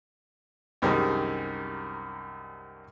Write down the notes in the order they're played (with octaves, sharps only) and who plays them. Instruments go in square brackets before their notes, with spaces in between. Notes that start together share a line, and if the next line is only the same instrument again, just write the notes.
[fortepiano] C2 F#2 D#3 G3 G#3 C4